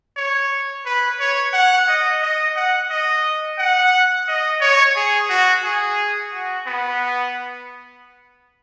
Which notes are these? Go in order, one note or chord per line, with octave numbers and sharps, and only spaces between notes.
C#5
B4
C#5
F#5
D#5
D#5
F#5
D#5
F#5
D#5
C#5
G#4
F#4
G#4
F#4
B3